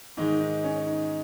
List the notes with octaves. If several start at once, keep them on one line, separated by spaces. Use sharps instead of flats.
G#2 D#3 G#3 D#4
D#4
C#4
D#4